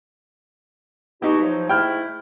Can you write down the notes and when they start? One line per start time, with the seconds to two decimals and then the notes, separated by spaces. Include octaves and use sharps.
1.22 B2 D#4 E4 F#4 G4
1.42 F3 F#3
1.69 G#2 A3 E4 G5 F6